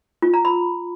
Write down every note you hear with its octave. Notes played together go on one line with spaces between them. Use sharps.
F4
A#5
B5